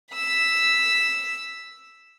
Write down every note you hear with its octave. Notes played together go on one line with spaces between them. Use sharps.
E6 B6